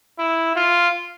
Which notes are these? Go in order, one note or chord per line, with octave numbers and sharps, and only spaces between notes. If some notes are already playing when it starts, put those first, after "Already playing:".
E4
F4